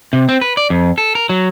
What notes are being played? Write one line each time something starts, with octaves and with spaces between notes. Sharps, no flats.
C3
C4
B4
D5
F2
A4
A#4
F#3